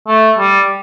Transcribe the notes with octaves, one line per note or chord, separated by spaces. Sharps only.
A3
G3